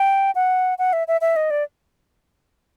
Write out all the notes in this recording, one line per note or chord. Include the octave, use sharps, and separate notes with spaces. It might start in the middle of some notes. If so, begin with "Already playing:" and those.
Already playing: G5
F#5
F#5
E5
E5
E5
D#5
D5